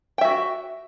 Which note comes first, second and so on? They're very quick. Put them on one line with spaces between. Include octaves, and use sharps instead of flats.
G5 E5 F#4